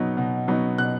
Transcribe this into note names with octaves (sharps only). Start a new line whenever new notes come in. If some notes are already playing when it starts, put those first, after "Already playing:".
Already playing: B2 F#3 B3 D#4
B2
F#3 B3 D#4
B2 F#6